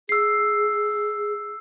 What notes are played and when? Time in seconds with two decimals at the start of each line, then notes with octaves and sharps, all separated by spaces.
0.09 G#4 E6 C7